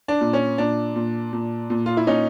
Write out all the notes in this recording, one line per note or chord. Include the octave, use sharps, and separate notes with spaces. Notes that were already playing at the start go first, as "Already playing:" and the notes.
D4
A#2
C#4
A#2 D4
A#2
A#2
A#2
F4
E4
A#2 C#4 D#4